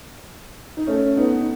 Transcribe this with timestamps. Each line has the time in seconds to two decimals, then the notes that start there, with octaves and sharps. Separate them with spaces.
0.77 D#4
0.87 A3 C#4
1.17 B3 D#4
1.41 D#4